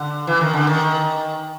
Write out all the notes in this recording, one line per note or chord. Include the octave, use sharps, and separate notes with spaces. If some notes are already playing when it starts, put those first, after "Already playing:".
Already playing: D3
E3
D#3
D3
D#3